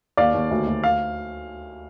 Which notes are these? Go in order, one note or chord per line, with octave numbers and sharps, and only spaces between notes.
D#2 D5 F5
D#2
D2
D2
F5